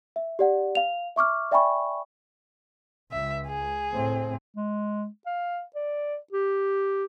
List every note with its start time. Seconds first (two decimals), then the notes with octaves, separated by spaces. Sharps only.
0.16 E5
0.39 G4 D5 F#5
0.75 F5 F7
1.16 E5 C#6 D6 F6
1.51 D5 E5 G5 G#5 B5 C#6
3.12 C#2 E5
3.47 G#4
3.92 A2 C4
4.56 G#3
5.26 F5
5.75 D5
6.33 G4